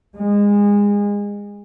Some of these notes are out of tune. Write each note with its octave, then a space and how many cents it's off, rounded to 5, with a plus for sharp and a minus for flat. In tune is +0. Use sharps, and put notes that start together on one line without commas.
G#3 -25